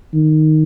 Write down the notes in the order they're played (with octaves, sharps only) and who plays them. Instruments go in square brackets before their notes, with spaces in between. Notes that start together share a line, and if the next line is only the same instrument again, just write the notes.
[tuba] D#3